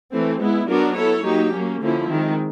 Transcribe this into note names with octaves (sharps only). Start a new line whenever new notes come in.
E3 A3 C4
G#3 B3 E4
F#3 B3 D4 F#4 A#4
B3 E4 A4 C#5
F#3 A#3 D#4 G4
F#3 A#3 C#4
D3 F3 A#3 C#4 E4
D#3 G#3 C4